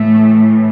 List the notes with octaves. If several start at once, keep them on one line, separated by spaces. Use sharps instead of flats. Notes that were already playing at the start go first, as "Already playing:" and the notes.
Already playing: A2 E3 A3